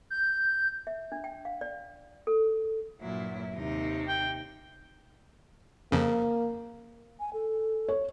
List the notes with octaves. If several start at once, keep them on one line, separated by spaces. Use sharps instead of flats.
G6
E5
D4
G5
F5
D5
A4
G2 A#2 F#3 E4
D#2 C3 D#4
G5
F2 C#3 A#3
G#5
A4
C#5